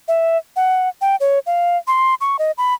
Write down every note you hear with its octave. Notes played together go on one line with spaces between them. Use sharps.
E5
F#5
G5
C#5
F5
C6
C#6
D#5
B5